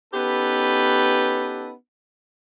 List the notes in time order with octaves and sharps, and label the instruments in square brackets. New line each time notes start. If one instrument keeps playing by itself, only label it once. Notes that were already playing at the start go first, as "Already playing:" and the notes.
[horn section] B3 C#4 D#4 G4 A4 B4